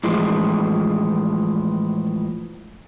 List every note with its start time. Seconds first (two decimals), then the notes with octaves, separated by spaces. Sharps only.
0.04 A2 E3 F3 G#3